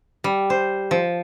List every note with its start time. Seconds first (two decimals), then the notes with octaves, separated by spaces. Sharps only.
0.24 G3
0.50 C5
0.91 F3